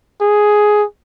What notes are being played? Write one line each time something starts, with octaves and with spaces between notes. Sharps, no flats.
G#4